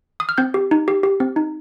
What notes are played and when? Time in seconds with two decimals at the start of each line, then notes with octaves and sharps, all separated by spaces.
0.20 D#6
0.29 F6
0.38 C4 G6
0.54 G4
0.71 D#4
0.88 G4
1.03 G4
1.20 C4
1.36 D#4